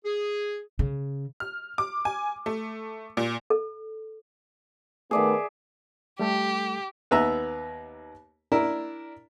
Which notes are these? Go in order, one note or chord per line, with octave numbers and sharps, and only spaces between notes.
G#4
C#3
F6
D6
G#5
A3
A#2
A4
D#3 A3 B3 G#4 D5 E5
G3 A3 G4 A4
D#2 B3 B4 E5 A#5
D4 E4 A#4